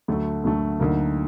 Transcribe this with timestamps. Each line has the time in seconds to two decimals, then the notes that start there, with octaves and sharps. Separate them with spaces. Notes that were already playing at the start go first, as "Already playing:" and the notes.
0.08 D2 D3 F#3 A3
0.44 D2 D3 F#3 A3
0.80 D2 D3 F#3 A#3 D#4